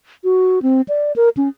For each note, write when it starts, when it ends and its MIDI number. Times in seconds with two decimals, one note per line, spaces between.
0.24 0.59 66
0.62 0.81 60
0.88 1.12 74
1.16 1.29 70
1.37 1.48 61